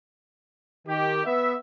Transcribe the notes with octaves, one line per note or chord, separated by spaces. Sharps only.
D#3 G4
B3 E5